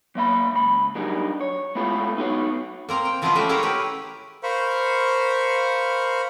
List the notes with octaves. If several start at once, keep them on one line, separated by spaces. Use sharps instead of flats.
F#3 A#3 E5 B5
C#2 B5
F#3 G3 D4 D#4 G#4 A#4
C#5
G#3 A3 B3 E4 F4 A4
B3 D#4 E4 F#4 B4 C#5
A#3 C4 A#5
G5
E3 F3 B3 E4 F4 D#5
A3 C#4 F#4 G4 E5
E4 G4 G#4 A#4 C#5
G4 B4
A#4 C5 F5 B5 C#6